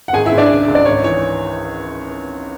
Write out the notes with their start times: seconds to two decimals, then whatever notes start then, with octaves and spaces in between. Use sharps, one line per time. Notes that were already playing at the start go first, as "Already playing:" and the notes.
0.08 F#5
0.13 G#1 G#4 G#5
0.26 E4 E5
0.32 G#1
0.38 D4 D5
0.50 C#2
0.68 C#2
0.75 D5
0.85 G#1 C#5
1.04 E3 C#5